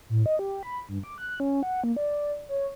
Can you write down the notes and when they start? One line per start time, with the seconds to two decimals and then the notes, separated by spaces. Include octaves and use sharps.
0.09 A2
0.26 D#5
0.39 G4
0.63 B5
0.89 G2
1.04 D6
1.18 F#6
1.40 C#4
1.63 F#5
1.84 A#3
1.96 D5
2.49 C#5